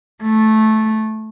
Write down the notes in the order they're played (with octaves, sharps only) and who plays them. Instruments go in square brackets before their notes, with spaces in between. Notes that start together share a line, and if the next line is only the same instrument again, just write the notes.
[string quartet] A3